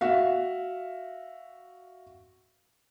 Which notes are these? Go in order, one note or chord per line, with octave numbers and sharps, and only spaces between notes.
F#4 E5 F5